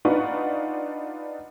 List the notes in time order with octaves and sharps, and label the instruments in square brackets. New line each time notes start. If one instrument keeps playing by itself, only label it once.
[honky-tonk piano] D4 D#4 F4 B4 F#5 C#6